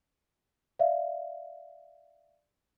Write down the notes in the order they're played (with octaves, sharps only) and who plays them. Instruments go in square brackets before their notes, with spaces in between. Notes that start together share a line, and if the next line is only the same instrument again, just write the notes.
[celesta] D5 E5 F5